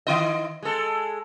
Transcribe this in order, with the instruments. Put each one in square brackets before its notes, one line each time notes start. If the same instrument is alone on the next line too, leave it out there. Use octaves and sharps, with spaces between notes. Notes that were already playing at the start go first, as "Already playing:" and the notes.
[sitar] D#3 E4 D#5
G#3 A4